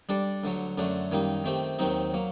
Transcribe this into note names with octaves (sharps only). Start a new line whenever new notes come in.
G3 D4 A4 D5
D2 D3 F#3
F#2 D3 F#3 A3 D4
F#2 D#3 G3 A#3 D#4
D#3 A3 C4 G4
D#2 D#3 F#3 C4 D#4
F#3 A#3